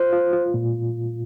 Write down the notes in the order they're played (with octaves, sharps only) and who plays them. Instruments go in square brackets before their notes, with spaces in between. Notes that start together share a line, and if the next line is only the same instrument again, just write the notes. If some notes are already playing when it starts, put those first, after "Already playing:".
Already playing: [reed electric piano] F4 [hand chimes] C5
[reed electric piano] F4
F4
A#2